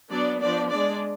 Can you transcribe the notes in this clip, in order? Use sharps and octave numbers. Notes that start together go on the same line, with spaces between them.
F#3 B3 D4 D5
F3 B3 D4 D5
G#3 D4 D5